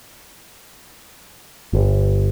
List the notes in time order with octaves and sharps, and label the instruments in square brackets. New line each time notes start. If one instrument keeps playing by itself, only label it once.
[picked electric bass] G1